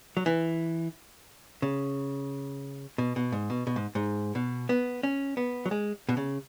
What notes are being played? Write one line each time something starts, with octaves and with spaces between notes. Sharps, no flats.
F#3
E3
C#3
B2
B2
G#2
B2
B2
G#2
G#2
B2
B3
C#4
B3
F#3
G#3
B2
C#3